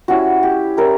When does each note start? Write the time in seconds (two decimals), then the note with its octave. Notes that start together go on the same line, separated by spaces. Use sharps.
0.08 G3 C#4 E4 F#4
0.43 G4
0.77 G3 C#4 E4 A#4